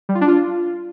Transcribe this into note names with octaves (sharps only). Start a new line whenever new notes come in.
G3
F4
D4
F4